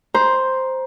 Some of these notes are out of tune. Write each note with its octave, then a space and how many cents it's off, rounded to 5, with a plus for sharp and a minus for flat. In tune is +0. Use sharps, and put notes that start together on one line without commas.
C5 +0 A#5 +25